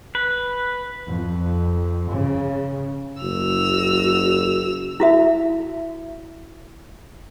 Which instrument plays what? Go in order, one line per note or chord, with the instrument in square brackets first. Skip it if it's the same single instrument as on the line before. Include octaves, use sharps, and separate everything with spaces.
[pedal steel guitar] B4
[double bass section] F2
C#3
[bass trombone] F#1 [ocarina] F#4 [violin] E6 F7
[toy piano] E4 F#4 E5